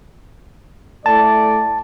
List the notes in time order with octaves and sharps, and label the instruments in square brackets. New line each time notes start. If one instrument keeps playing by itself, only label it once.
[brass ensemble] A3 E4 D5 [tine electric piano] A5